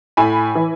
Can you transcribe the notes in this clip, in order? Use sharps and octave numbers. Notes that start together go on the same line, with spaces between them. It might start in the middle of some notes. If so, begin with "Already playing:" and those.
A2 G#5 B5
E3